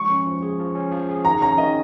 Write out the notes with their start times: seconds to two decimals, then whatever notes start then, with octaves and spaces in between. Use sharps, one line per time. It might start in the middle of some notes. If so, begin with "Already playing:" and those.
Already playing: F3 G#3 C#6
0.10 C#4
0.26 F3
0.42 G#4
0.59 F3
0.75 C#4
0.92 F3
1.09 G#4
1.25 D#3 A#5
1.41 C#4 A#5
1.58 D#3 D#5